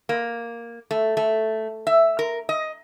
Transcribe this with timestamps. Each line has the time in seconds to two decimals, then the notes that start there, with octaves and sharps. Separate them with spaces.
0.09 A#3
0.91 A3
1.17 A3
1.87 E5
2.19 A#4
2.49 D#5